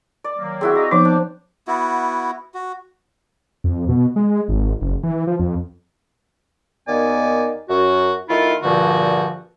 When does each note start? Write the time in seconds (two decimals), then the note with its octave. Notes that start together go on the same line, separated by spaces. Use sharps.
0.24 D5
0.38 D#3 F#3 A#3
0.61 C4 E4 F#4 G#4
0.76 D#5 F5 A#5
0.91 F3 B3 D#4 C5 D6
1.05 D4
1.67 B3 E4 F#4
2.54 F#4
3.64 F2
3.89 B2
4.16 G#3
4.48 G#1
4.81 F#1
5.03 E3
5.27 F3
5.39 F2
6.87 D#2 D#3 B3 D5 G#5
7.69 F#2 F#4
8.29 D#3 A3 E4 F4
8.63 G2 A#2 D3 F3 F#4